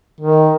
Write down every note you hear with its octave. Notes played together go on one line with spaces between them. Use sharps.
D#3